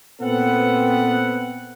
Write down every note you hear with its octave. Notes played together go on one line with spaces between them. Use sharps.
A#2 B3 C4 A4 B4 F#5